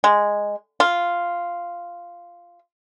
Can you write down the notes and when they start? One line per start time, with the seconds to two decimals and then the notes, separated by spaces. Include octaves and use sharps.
0.04 G#3
0.80 F4